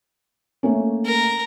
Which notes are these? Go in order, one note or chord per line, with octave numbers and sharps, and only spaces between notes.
A3 A#3 C#4
A#4